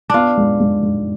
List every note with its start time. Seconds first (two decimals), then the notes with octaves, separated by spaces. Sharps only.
0.10 B3 D4 F4
0.37 G#3
0.60 G#3
0.83 G#3